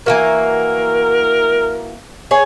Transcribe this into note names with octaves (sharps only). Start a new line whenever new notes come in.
E3 A#3 F#4 A#4
G#4 C#5